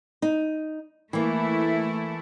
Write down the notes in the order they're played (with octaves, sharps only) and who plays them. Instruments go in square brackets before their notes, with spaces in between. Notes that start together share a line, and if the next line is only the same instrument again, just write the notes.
[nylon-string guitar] D#4
[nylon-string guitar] E3 A#3 [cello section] A3 E4